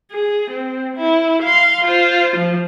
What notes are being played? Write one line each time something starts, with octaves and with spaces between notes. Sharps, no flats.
G#4
C4
E4
F5 C6
F4 C5
F3